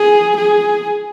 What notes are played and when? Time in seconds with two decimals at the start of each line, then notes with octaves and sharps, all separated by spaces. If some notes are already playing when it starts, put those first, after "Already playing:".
Already playing: G#4
0.37 G#4